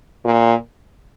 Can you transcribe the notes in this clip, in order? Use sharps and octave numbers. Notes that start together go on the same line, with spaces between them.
A#2